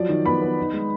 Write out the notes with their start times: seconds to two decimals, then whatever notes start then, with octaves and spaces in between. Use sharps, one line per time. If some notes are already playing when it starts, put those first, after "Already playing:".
Already playing: F3 F#3 D5
0.09 D#3
0.26 B3 B5
0.42 B3
0.58 D#4
0.73 G#3